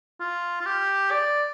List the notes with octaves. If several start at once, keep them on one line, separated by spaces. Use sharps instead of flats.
F4
F4
G4
D5